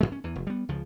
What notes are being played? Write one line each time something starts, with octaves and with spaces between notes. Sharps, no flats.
F#2 A#2 G#3
C#4
E2 E3
F1
G3 B3
C#2 C#3 F3